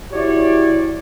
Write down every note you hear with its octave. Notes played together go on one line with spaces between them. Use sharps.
E4 F#4 G4 C#5 D5